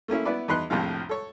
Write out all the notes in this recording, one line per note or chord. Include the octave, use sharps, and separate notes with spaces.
A3 A#3 C#4 E4
B3 E4 B4 D5
E2 D#4 B4 C6 F#6
A#1 F2 A2 C3 F3 F5
A4 C#5